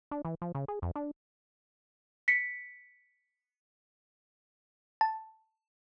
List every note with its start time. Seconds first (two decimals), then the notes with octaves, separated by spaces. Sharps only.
0.11 D4
0.25 E3
0.42 F3
0.55 C#3
0.68 G#4
0.82 F2
0.96 D4
2.28 B6 C#7
5.01 A5